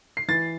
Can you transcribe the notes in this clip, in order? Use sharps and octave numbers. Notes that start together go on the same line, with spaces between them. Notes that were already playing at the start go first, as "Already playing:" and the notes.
C7
E3 A6